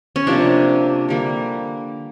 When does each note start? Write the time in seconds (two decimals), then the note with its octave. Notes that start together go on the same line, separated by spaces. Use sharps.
0.16 C#4
0.27 C3 F3 A#3 D4
1.09 D3 G3 A#3